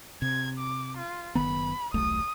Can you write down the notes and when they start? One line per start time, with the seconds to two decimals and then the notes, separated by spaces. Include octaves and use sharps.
0.22 C3 G#6
0.59 D6
0.98 F4
1.35 F#1 D#3 B3 B5
1.94 D#1 B1 A3 D#6